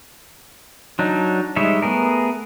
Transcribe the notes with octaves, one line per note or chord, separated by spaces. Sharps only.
F#3 D4 D#4
G3 G#3 D#4 C#5 E5
A3 B3 G#4 A#4